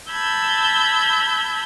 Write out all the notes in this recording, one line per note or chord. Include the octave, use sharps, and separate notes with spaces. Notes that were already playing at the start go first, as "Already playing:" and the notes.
A5 B5 E6 G6 G#6